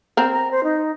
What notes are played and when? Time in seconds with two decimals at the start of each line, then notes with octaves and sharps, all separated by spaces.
0.17 C4 A#4
0.32 A#5
0.51 C5
0.64 D#4